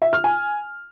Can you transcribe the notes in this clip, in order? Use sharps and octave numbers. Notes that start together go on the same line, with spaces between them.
E5
F6
G#5